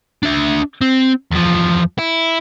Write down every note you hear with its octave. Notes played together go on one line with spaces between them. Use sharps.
D4 E5
C4
E2 F3
E4